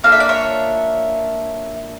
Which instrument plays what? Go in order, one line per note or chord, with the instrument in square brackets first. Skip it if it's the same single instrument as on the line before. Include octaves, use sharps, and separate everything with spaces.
[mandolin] A#3 D4 F4 A4 F5
E5
D5
C#5 E5